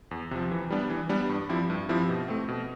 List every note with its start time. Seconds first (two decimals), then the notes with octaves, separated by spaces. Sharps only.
0.11 E2
0.31 C3 F3
0.51 E3
0.70 G3 B3 D4
0.90 E3
1.09 G3 B3 D4
1.29 G2
1.49 F3 C4 E4 G4
1.70 G2
1.89 F3 C4 E4 G4
2.09 B2
2.28 A3 C4
2.49 B2